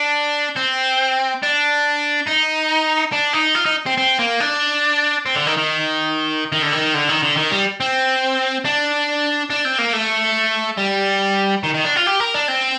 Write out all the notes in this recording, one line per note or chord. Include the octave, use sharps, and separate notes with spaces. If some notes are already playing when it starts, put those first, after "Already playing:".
Already playing: D4
C4
D4
D#4
D4
D#4
F4
D#4
C4
C4
A#3
D4
C4
D3
D#3
D#3
D#3
D3
D#3
D3
D#3
D3
D#3
G3
C4
D4
D4
C4
A#3
A3
G3
D#3
D#3
D4
F4
G4
A#4
D4
C4